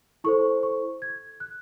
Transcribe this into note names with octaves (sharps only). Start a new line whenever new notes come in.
E4 A4 C5 C#6
C#6
G#6
F#6